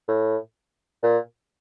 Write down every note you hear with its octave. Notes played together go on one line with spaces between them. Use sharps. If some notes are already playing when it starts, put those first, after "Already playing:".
A2
A#2